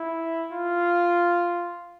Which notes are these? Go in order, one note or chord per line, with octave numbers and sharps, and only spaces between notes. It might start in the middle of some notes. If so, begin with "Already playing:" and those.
Already playing: E4
F4